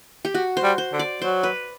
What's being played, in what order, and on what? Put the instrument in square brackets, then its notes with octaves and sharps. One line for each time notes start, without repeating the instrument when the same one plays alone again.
[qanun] G4
F#4
C5
[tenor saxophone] G3
[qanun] C5
[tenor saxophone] D3
[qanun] D5
[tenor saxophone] F#3 [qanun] C5
[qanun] B4